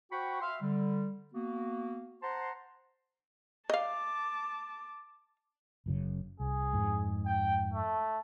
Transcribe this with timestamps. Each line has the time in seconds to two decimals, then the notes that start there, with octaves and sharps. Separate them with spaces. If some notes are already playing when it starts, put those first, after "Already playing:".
0.11 F#4 C5 F#5 G5 B5 C#6
0.40 E5 F5 C6
0.61 D3 G3
1.33 A#3 B3 F#4
2.22 C5 F#5 A5 A#5 C6
3.70 D#5 F5 A5 D6
5.86 F#1 F#2 C#3
6.40 C2 G#4
6.73 F2 G#2
7.26 G5
7.73 A3